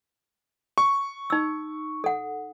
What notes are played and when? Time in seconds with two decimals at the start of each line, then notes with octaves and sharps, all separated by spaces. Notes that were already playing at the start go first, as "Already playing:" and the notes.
0.78 C#6
1.30 D#4 E6
2.04 A4 F#5